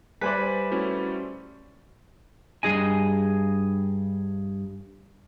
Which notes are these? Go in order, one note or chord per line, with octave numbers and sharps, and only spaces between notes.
G3 B4 C5 D5 E5 G#5 B6
A3 C#4 E4 F#4
G2 G#4 D#5 G#5